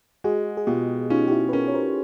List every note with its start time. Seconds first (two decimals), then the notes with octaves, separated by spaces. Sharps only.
0.24 G#3 F#4 G#4
0.57 G#4
0.67 B2 F4 G4
1.10 C#4 D#4 F4
1.28 G4
1.31 E4 F#4
1.49 B4
1.53 C#4 G#4 A#4
1.68 C#5
1.74 A#4 C5